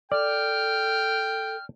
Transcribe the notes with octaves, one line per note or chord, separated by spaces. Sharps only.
A4 D5 G5 F6